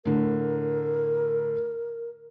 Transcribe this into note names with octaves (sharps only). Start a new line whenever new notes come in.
A2 D3 A#4